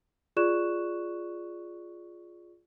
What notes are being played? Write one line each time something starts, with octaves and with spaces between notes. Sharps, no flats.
F4 G#4 D5 C#6 F#6 E7